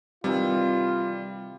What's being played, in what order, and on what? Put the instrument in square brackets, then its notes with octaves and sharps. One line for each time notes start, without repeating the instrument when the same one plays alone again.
[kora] C3 D#3 E3 [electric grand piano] G3 [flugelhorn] F4